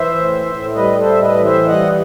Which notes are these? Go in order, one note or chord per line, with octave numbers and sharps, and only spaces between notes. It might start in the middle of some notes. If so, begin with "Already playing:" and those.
Already playing: E3 C5 E5
A2
A2
G3 B4 D#5
A4 C5
A2 E5
B4 D#5
E3
C5 E5
G3 D#5 F#5